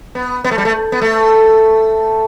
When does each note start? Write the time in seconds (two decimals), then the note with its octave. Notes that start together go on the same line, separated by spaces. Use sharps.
0.15 B3
0.44 B3
0.51 A3
0.58 G3
0.65 A3
0.92 B3
1.01 A3